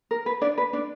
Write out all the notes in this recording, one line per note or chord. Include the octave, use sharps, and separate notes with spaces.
A#4
B4
D4 D5
B4
D4 D5